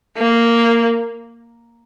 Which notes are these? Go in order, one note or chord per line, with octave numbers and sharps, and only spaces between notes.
A#3